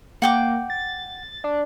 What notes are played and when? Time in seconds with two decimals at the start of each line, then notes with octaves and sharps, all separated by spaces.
0.22 A#3 F#5 G5 D6
0.70 A6
1.44 D4